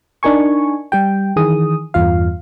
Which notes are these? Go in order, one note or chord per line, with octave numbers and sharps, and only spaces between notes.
D4 D#4 A#4 G#5 C#6
G3 G4 G5
D#3 E3 G#4 D#6
E2 G2 F4 F5